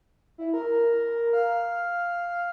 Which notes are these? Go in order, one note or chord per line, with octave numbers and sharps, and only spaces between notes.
E4
A#4
F5